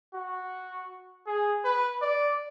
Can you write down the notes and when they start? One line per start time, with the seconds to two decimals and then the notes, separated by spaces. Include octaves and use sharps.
0.14 F#4
1.26 G#4
1.64 B4
2.02 D5